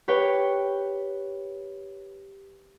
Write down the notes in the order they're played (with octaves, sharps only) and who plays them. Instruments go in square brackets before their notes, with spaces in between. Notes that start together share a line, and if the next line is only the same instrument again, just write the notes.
[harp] G4 B4 C#5 G5